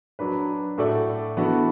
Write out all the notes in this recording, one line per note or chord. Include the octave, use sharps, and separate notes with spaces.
F#3 D4 B4
A2 A3 F#4 A4 D5
E3 B3 D4 F#4 A4